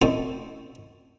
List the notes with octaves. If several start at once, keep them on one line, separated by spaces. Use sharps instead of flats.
F#2 A2 C4 D#4 C5 A5